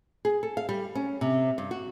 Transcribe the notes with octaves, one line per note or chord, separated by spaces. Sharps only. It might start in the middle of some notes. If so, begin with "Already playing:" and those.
G#4
A4
F5
G3
C#4
C3
G2
F#4